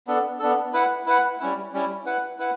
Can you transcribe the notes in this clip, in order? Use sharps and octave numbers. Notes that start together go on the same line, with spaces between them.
B3 D4 A4
B3 D4 A4
E4 B4 F#5
E4 B4 F#5
G3 C#4 E4
G3 C#4 E4
E4 B4 F#5
E4 B4 F#5